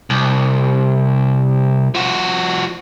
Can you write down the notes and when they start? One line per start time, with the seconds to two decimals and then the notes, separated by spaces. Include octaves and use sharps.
0.10 C2
1.95 F3 F#4